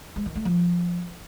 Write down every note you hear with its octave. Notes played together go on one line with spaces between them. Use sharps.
G#3
D#3
A3
F3